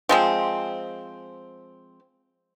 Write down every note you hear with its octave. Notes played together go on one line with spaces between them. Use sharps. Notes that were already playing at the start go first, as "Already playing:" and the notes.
F3 G#3 C4